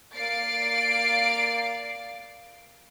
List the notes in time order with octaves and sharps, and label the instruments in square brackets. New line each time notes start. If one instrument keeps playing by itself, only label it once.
[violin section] A#3 D5 F5 A6 C7 D7